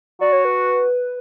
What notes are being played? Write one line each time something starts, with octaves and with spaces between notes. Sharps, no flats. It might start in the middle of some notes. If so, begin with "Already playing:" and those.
F#4 D5
C#5
B4